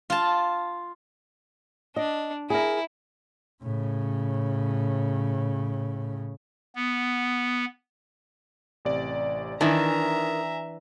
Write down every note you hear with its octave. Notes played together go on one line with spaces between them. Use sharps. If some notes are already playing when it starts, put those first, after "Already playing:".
F4 A5
D4 D#5
E4 G#4 A#4
A2 C#3
B3
A1 C3 D5
D#3 E3 D4 E5 G#5 A#5